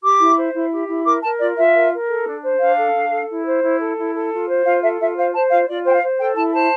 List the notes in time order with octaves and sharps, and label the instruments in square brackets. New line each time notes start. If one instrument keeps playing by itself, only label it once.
[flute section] G4 D6
E4
C5
E4
G4
E4
A#4 D6
A#4 A5
F4 D5
F4 E5
A#4
A#4
A4
D4
C5
D4 F5
A4
D4
A4
E4
C5
E4
A4
E4
A4
F4
C5
F4 F5
A4 E5
F4 E5
C5 F5
C5 A5
F4 F5
F4 D5
C5 G5
F5
C5
A4 G5
E4 A5
C5 A5